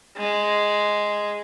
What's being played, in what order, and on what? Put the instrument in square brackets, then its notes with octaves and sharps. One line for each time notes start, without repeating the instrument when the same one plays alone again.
[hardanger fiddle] G#3